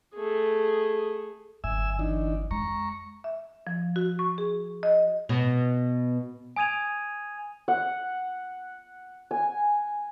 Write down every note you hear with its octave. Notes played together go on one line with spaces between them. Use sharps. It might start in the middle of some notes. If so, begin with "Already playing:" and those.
A3 G#4
G1 F#3 E5 G#5 E6
E3 D4 D#4
F2 G#3 A#5 C#6
E5
F3
F#4
C#6
G#4
D#5
B2
G#5 D#6 G#6 D#7 F7
F#5
G#5